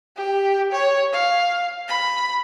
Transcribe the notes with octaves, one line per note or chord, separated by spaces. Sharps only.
G4
C#5
F5
B5